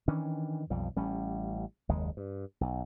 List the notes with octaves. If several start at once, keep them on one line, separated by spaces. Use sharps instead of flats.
D#3 E3 C#4 D4
B1 F2 G3
A1 G3 C#4
F#1 D#2 G#3
G2
B1